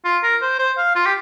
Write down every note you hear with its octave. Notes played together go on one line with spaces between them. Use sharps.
F4
A#4
C5
C5
F5
F4
G4